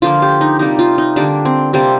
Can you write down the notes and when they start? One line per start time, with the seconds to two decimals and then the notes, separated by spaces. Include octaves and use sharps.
0.02 D3 F3 A#3 F4
0.22 G4
0.41 D#4
0.59 C3 G3 A#3 D#4
0.79 F4
0.98 D#4
1.16 D3 G3 A#3 D4
1.45 C4
1.73 C3 G3 A#3 C4